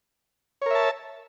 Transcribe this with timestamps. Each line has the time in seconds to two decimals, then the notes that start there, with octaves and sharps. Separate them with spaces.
0.62 C#5
0.66 A#4
0.71 E5
0.75 A5